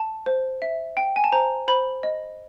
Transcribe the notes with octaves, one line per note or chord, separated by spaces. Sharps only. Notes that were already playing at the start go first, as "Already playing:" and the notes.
Already playing: A5
C5
E5
G5
G#5
A5
C5 A#5
C5 B5
D#5